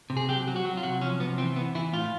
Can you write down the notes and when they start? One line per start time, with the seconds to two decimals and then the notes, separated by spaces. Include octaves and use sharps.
0.10 C3
0.17 G#4
0.28 F#3 G4
0.47 F#3
0.56 F#4
0.65 F#3
0.77 F4
0.83 C3 F#4
1.01 F3 C#4
1.20 C3 B3
1.38 E3 C4
1.56 E3 B3
1.75 E3 E4
1.93 A2 F4